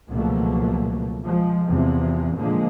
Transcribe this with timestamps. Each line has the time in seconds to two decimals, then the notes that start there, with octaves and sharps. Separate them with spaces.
0.10 C#2 B2 F3 F#3 A3 A#3
1.23 F3 G#3
1.67 E2 C3 E3 F3
2.37 A#2 D3 F3 G#3 A#3